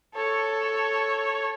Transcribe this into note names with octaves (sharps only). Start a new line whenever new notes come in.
A4 C#5